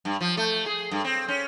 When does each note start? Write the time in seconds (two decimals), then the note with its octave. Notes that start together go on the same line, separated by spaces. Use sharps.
0.05 G2
0.21 F3
0.37 A3
0.66 G#4
0.91 G2
1.04 C4
1.28 C#4